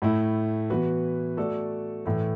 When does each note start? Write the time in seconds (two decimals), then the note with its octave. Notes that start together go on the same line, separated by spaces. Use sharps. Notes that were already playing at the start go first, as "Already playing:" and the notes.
0.02 A2 A3 E4
0.70 E3 B3 F#4 B4
1.37 A3 F#4 A4 D5
2.05 A2 E3 A3